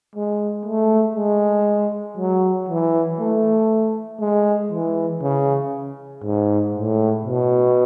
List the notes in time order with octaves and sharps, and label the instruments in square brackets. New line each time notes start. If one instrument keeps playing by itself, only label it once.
[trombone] G#3
A3
G#3
F#3
E3
A3
G#3
E3
C#3
G#2
A2
B2